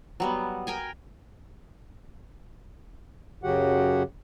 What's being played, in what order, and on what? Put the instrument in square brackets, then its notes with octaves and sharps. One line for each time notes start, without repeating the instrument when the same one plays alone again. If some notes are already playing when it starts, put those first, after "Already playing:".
[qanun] F#3 G3 B3
A#4 G5 G#5
[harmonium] F#2 C#3 F#3 F#4 G4 F#5